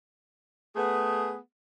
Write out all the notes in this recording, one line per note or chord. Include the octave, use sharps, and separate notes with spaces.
A3 B3 G#4